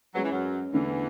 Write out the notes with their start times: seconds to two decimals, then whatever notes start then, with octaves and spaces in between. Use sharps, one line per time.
0.14 F#3 G#3 C#4 G#4 B4
0.23 E3
0.32 F#2 F#3
0.73 E2 D3 E3 A3 D4